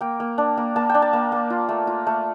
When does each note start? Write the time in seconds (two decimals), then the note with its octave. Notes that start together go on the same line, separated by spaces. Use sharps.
0.01 A#3 G5
0.20 A#3
0.38 D4
0.57 A#3
0.76 A#3 A5
0.89 D4 G5
1.02 A5
1.13 A#3
1.32 A#3
1.50 F4
1.69 A3
1.87 F4
2.07 A3